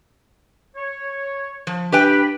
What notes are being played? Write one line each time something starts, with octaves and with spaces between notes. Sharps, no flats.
C#5
F3
D4 G4 B4 G5 B5